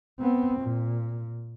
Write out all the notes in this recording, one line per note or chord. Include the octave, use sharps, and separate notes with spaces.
B3 C4
A#2